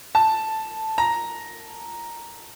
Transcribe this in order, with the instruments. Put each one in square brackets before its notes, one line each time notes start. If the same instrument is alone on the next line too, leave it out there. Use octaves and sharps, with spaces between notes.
[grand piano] A5
A#5